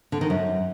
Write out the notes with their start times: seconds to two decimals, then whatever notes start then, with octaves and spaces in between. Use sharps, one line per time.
0.12 D3
0.21 D#3
0.30 F#2